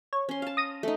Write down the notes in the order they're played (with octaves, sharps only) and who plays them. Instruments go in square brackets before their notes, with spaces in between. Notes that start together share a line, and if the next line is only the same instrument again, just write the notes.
[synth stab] C#5
[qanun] C#4 C6
F5 A5
[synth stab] D#6 A#6 D#7
[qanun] A3 D#4